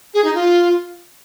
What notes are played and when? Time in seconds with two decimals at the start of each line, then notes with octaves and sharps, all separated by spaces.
0.13 G#4
0.24 D#4
0.34 F4